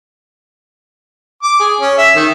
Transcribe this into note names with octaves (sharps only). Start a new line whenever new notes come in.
D6
G#4
C#4
E5
D#3